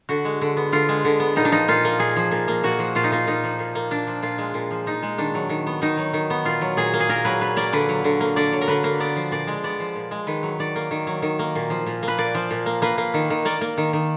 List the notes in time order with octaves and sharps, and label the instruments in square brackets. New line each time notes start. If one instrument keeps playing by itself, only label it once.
[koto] D3 F#4
G#3
D3
B3
D3 F4
G#3
D3
B3
A#2 D#4
D4
F3 D#4
A#2 F4
A#3
A#2 G#4
F3
A#2
A#3
A#2 F#4
F3
A#2 F4
D#4
A#3 F4
A#2 D#4
F3
A#2
A#3
A#2 D4
F3
A#2 F4
G#3
A#2
F3
A#2 D#4
G#3
D#3 D4
F#3
D#3
B3
D#3 D#4
F#3
D#3
B3
A#2 F4
F#3
A#2 G#4
A#3
G#4
A#2 A#4
F#3 B4
A#2 B4
A#3 D5
D3 B4
F#3
D3
A#3
D3 D5
F#3
A#4
D3 B4
A#3
B3 D5
F3
A#2 D5
G#3
B3 D5
F3
A#2
G#3
D#3 B4
F#3
D#3 D5
A#3
D#3
F#3
D#3
A#3
A#2
F3
A#2
A#3
B4
A#2 D5
F3
A#2
A#3
A#3 B4
A#3
D#3
D#3
A#3 D5
A#3
D#3
D#3